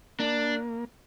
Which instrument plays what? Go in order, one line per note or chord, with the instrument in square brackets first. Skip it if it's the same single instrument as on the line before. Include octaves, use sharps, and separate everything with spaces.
[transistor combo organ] A#3 [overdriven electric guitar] D4